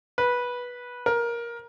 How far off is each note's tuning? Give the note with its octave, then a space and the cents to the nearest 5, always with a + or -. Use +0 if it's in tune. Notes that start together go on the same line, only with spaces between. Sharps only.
B4 -15
A#4 +15